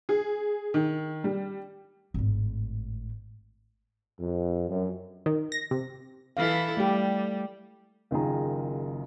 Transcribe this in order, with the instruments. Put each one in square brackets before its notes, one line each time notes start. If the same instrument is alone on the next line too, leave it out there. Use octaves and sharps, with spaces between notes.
[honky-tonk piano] G#4
D#3
G3
[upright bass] G#1 A2
[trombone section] F2
F#2
[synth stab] D#3
A#6
C3
[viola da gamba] E3 E4 A4 [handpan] F5
[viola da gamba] G3 [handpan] A3 G4
[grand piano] F#1 D#3 F4 G#4 A#5